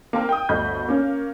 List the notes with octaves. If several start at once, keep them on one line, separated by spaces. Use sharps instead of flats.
A#3 C4 A#4
G5 D#6
G1 D2 D#5 B5 G6
A#3 C#4